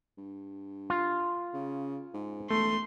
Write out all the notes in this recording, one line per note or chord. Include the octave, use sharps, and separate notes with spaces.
G2
F4
C#3
G#2
E1 A3 C6